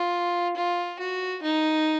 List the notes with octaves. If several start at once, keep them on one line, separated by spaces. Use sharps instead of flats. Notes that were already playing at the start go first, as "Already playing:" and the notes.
Already playing: F4
F4
F#4
D#4